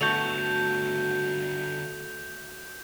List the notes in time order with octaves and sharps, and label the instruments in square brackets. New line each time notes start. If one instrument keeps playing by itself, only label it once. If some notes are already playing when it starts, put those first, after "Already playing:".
[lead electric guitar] D3 B3 [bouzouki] A3 F#4 A4 [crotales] G6 F7